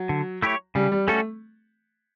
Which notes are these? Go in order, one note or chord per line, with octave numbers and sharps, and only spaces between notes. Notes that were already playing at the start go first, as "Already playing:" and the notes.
Already playing: F#3
D3
A3 E4 G4 C#5
C#3 G3
G3
G3 A3 C#4 F#4 A4